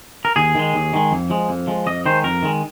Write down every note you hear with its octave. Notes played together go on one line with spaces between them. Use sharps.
A#4
D#2 G#4
D#3 G#3
D#2
D#3 G#3
F2
F3 G#3
F2
F3 G#3
F2 D#5
D#3 G#3 C5
F2 A#4
D#3 G#3